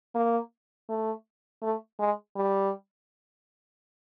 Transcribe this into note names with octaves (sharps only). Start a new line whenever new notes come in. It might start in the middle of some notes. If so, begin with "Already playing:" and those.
A#3
A3
A3
G#3
G3